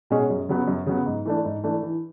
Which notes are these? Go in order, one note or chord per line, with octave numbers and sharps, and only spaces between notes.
B2 G#3 C#4 G#4
F#2
C#3 F#3 B3
F#2
C#3 F#3 B3
G#2
E3 A3 D4
G#2
E3 A3 D4
E3